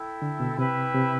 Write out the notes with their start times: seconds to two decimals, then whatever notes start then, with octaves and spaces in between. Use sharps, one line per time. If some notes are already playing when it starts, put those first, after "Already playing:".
Already playing: E4 A4 E5 G5
0.22 D3
0.40 B2
0.58 C3 E4 B4 E5 G5
0.94 C3